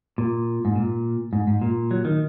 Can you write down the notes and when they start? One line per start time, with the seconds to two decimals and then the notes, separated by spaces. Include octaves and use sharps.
0.18 A#2
0.65 G#2
0.76 A#2
1.33 G#2
1.47 G#2
1.62 A#2
1.91 F#3
2.05 D#3